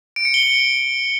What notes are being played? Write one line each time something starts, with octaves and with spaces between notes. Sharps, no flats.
D7
C#7
G7
C#7